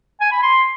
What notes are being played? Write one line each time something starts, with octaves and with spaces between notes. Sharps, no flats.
G#5
B5
C6